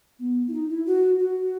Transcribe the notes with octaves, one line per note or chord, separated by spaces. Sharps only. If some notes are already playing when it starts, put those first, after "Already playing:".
B3
E4
D#4
E4
F#4
F#4